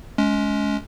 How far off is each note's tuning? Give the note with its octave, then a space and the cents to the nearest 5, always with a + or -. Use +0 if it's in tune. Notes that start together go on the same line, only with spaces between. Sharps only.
G#3 +25 C#4 +25